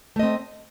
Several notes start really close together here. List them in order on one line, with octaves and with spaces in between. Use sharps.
A3 D#5 C4